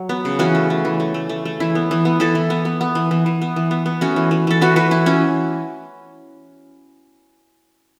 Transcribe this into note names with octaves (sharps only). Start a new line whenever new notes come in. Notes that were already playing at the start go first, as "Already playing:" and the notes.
Already playing: F#3
B3
C#3
E3 C#4 F#4
A3
A3
E3
A3
A3
A3
A3
E3 E4
B3
E3
B3
E3 E4 A4
E3
B3
B3
B3
E3
E3
E3
B3
E3
B3
B3
A3 C#4 F#4
E3
E3
E3 A4
E3 F#4 B4
E3 F#4 B4
E3 E4
E3 C#4 F#4